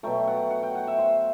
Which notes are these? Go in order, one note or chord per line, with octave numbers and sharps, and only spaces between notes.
B2 F#3 A3 G5
F#5
F#5
G5
F#5
E5
C5